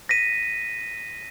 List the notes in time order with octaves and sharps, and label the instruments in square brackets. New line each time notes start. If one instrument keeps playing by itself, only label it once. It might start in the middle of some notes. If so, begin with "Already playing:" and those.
[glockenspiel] A#6 B6 D#7